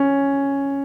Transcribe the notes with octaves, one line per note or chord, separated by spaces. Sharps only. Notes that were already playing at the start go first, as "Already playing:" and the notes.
Already playing: C#4